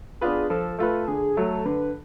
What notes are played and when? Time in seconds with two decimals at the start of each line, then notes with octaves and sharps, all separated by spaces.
0.21 B3 D4 F4 G#4 B4
0.50 F3 A4
0.78 A3 F4 A4 B4
1.08 D3 G#4
1.37 F#3 A3 A4
1.65 D3 B4